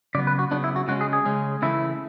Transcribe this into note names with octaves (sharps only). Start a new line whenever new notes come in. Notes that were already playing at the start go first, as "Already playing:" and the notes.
C#3 F#3 B3 D5
B4
F#4
C#3 F#3 B3 D4
E4
F#4
C#3 G#3 C#4 F#4
G#4
G#4
C#3 G#3 C#4
C#3 E3 A3 E4